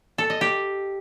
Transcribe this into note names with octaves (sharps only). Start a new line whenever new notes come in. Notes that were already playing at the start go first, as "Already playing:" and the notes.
A4
D#5
G4